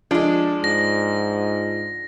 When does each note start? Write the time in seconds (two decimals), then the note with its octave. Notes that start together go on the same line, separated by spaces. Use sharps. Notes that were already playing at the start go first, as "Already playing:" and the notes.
0.11 F3 G#3 D4
0.64 G#2 A#6